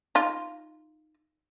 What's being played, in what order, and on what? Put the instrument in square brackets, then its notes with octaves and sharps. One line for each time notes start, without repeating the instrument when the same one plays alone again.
[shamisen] D#4 F4